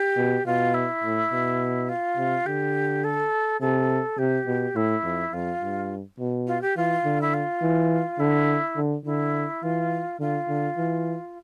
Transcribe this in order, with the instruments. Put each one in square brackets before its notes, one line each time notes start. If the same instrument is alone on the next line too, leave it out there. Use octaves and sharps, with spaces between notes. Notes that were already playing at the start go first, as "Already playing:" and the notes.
Already playing: [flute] G4
[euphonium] B2
[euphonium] B2 [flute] F4
[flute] E4
[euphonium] A2
B2
[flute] F4
[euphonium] C3
[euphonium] D3 [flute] G4
[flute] A4
[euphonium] C3 [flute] A4
[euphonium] C3 [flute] G4
[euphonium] B2
[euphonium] A2 [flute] E4
[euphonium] F2
[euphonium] F2 [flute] F4
[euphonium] G2
B2
[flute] F4
G4
[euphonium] E3 [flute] F4
[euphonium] D3
[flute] E4
F4
[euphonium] E3
[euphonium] D3 [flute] E4
[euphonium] D3
[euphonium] D3 [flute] E4
[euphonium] E3 [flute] F4
[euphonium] D3 [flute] F4
[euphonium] D3
E3